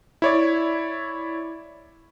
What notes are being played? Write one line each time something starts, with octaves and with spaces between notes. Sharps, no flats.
E4 C#5 D5